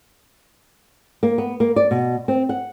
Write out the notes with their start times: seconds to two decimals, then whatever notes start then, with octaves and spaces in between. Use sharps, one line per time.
1.23 A#3
1.38 B3
1.60 A#3
1.76 D5
1.91 B2
2.28 C4
2.49 F#5